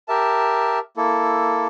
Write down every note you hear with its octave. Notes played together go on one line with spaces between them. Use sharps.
G4 A#4 E5 A5
A#3 E4 A4